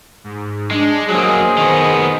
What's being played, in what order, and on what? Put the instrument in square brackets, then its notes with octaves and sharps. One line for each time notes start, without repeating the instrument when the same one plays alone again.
[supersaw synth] G#2
[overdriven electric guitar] G#3 [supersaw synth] D4
[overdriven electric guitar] F#3 A#3 [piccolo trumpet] G#4 [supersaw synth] C5 D#5
[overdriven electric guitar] D#3 B3